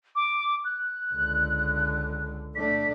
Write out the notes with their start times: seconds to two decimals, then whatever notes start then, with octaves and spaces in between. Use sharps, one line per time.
0.15 D6
0.65 F#6
1.13 C#2 D3
2.55 A3 D4 B6